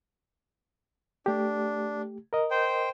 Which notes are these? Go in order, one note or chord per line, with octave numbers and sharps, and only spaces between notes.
A3 D4 G4
A#4 D#5
C5 G5